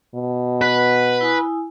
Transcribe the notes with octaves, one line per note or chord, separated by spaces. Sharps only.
B2
B4 F#5
E4 G#5 D#6